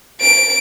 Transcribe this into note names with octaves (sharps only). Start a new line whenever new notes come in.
D7